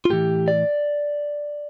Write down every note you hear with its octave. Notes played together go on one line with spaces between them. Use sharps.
F4
A2 E3 G4
D5